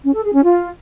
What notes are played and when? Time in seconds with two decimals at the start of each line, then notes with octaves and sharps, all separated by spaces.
0.04 C#4
0.14 A4
0.24 G#4
0.34 C#4
0.44 F4